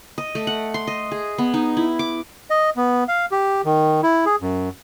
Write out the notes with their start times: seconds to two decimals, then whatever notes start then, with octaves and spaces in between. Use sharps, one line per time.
0.18 D#5
0.35 A3
0.47 F#5
0.74 C6
0.87 D#5
1.12 G#4
1.38 B3
1.54 D#4
1.77 E4
1.99 D6
2.50 D#5
2.77 B3
3.08 F5
3.32 G4
3.65 D#3
4.03 E4
4.26 G#4
4.42 F#2